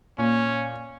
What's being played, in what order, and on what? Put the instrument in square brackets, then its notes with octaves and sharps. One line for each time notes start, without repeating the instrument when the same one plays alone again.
[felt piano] A#2 [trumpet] C#4